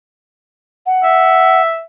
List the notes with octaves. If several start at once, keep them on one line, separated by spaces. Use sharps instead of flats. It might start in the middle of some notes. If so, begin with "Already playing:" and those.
F#5
E5